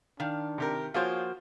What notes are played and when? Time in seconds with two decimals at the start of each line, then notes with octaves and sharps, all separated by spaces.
0.20 D#3 D4 F5
0.58 C3 G4 A#4
0.94 F3 A#3 F4 F#4 G#4 C5 C#5